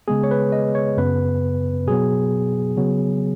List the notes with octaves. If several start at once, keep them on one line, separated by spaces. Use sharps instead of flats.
C#3 G#3 B3 G#4
C#5
B4
D#5
C#5
F#2 C#3 B3 B4
B2 F#3 B3 G#4
C#3 F#3 B3